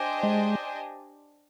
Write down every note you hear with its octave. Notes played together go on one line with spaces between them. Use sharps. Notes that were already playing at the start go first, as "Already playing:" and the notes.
Already playing: D4 G4 C5 D#5 G#5
G#3